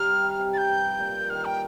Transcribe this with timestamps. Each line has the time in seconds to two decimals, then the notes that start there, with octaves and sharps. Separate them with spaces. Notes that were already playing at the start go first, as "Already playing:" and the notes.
Already playing: G2 C3 D#4 F6
0.09 G3
0.24 G3
0.39 C3
0.54 G3 G6 A6
0.70 G2
0.84 F3
1.00 A#2
1.15 A#2
1.30 D#3 F6
1.45 D#4 G5